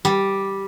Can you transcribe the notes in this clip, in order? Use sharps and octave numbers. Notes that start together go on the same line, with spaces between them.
G3